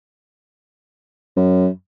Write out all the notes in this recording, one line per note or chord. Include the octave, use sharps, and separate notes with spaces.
F#2